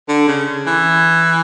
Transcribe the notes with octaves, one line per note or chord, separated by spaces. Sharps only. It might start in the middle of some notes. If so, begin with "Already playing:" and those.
D3
C#3
E3